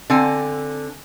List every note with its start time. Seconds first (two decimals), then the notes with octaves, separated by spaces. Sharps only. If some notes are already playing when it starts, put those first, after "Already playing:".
0.10 D3 C4 G#5